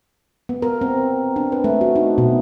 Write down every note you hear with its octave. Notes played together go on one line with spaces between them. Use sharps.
B3
A#4
C4
D4
B4
A3
F#4
D#4
B2